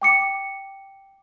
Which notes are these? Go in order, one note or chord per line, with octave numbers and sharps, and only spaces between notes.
G5 D6 C#7